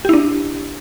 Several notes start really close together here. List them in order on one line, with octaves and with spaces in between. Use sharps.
G4 E4 D4